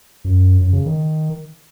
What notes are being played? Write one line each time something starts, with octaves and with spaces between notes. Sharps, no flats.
F#2
F#2
C#3
D#3